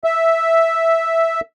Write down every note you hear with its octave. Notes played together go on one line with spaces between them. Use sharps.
E5